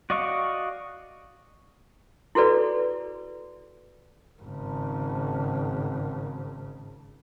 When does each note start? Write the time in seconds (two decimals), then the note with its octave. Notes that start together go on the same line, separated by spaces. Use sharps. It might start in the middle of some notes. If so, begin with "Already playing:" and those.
0.10 F#4 D5 D#5 F5 C#6
2.35 E4 F#4 G#4 A4 B4 D5
4.42 G#1 C#3